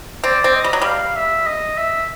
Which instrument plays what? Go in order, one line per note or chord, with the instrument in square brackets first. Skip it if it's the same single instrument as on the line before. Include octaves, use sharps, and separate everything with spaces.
[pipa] C4 [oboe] D5
[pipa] C4
[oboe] D#5
[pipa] G3
F#3
[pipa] G3 [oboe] F5
[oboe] E5
D#5
E5